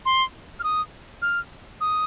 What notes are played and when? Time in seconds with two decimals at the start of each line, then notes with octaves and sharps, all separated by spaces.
0.06 C6
0.60 F6
0.64 D#6
1.22 F6
1.81 D#6